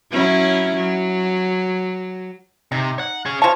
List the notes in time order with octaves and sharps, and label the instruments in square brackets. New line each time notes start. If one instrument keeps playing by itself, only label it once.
[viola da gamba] F#3 C#4 E4
F#3
[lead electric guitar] C3 [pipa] D#4
[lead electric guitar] F#5
C#4 G#4
[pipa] F3 A5 [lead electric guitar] C#5